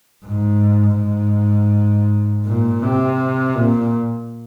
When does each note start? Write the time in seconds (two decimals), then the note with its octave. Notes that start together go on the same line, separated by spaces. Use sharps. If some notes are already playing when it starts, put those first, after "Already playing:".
0.25 G#2
0.99 G#2
2.45 A#2
2.82 C3
3.55 A#2